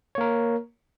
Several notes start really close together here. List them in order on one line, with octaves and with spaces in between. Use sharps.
C#5 A#3 A#4